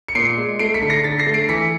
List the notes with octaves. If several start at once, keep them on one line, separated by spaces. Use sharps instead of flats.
C#7
A#2 C7 D7
G#3
A3 C7 D7
B6 C#7
D3
A#6 C7
D3 A6 B6
A#6 C7
A3
C7 D7
E3 B6 C#7